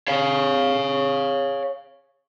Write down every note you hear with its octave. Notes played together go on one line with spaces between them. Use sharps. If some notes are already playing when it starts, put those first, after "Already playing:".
C#5 F5